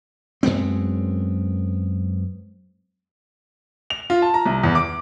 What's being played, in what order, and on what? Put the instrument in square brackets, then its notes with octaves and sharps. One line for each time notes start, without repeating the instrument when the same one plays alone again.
[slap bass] F#2 G#3 B3 C4
[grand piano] F7
F4
A5
A#5
C2
E2
D6